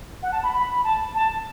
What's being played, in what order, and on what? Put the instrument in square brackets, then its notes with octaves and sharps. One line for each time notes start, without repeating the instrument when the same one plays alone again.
[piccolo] F#5
A5
B5
B5
B5
A5
A5